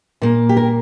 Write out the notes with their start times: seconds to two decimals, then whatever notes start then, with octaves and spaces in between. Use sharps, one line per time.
0.22 A#2 A#3
0.49 G4
0.57 A#4